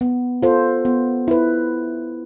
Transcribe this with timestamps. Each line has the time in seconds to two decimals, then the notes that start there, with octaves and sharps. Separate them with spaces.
0.01 B3
0.43 F4 A4 C5
0.85 B3
1.28 E4 B4